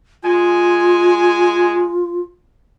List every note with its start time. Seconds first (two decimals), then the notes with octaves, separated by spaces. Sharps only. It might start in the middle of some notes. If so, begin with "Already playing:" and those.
0.24 G#3 F4 G#5